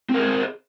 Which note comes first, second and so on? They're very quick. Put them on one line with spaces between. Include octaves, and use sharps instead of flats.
C4 A#4 G#4 C5